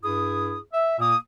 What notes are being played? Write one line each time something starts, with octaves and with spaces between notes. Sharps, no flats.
G2 E4 G#4 D#6
E5
A#2 A#3 D#6